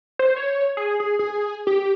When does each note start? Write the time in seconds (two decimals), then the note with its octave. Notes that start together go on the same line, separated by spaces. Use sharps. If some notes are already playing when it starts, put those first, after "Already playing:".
0.19 C5
0.36 C#5
0.77 G#4
1.00 G#4
1.19 G#4
1.67 G4